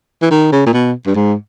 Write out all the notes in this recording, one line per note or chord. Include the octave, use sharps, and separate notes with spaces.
E3
D#3
C#3
A#2
B2
G2
G#2